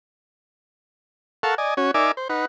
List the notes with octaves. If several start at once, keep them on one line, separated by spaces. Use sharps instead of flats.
A4 A#4 F5 F#5 A5 C#6
D5 D#5 G#5
C#4 F#4 C#5
D#4 A#4 D5 E5 G#5 D6
C5
D#4 B4 F#5